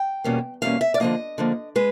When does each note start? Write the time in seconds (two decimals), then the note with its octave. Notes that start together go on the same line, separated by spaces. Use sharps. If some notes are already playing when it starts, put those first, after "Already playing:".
Already playing: G5
0.24 E2 B2 G3 A#3 C#4
0.62 E2 B2 G3 A#3 C#4 F5
0.81 E5
0.94 D5
1.00 D3 F3 A#3 D#5
1.38 D3 F3 A#3
1.76 G#3 B4